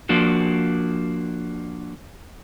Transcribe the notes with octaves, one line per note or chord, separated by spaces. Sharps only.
F3 A#3 D4 F#4